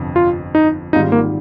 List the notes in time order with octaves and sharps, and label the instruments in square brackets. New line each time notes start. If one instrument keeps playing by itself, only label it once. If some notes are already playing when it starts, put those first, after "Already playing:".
Already playing: [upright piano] G1 F2 C3 F3
[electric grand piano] F4
D#4
[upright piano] G#1 G#2 G3 C4 F4 [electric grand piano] D#4
[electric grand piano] A#3